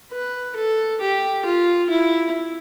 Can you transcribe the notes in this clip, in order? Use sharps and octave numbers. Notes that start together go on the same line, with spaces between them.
B4
A4
G4
F4
E4